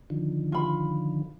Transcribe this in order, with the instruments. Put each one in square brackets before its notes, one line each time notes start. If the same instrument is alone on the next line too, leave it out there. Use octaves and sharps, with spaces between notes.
[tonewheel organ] D3 D#3 F3
[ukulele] F4 B5